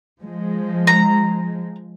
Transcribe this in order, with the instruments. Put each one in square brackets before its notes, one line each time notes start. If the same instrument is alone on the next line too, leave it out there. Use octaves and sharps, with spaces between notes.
[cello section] F3 G#3
[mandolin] A#5